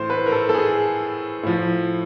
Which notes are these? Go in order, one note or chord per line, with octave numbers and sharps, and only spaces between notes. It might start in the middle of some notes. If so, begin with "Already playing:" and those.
Already playing: A2 E3 C5
B4
A#4
A4
A4
G#4
A2 F3